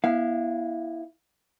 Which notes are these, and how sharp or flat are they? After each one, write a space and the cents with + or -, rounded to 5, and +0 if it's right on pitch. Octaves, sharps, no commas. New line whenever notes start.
B3 -30 E4 +0 F5 -20